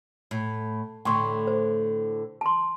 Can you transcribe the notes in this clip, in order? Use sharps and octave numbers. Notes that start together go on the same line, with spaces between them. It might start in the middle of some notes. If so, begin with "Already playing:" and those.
A2
A2 D3 G5 C6 C#6
C5
A5 C6